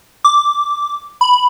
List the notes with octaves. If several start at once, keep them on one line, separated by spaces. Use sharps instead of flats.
D6
B5